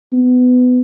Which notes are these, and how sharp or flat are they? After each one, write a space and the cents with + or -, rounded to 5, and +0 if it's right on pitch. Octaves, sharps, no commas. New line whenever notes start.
B3 +20